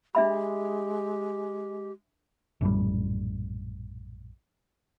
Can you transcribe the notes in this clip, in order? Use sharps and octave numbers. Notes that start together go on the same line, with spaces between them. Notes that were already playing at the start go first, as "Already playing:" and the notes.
G#3 D4 G4 E5 B5
A#1 F#2 A2 G3